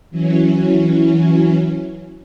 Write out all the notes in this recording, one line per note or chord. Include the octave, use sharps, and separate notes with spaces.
E3 F#3 C#4